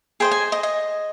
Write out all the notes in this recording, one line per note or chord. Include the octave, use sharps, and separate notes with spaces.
G#4 C5 D#5 G5
G#5
D#5
D#5